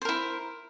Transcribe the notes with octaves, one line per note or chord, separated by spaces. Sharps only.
E4 A#4 C5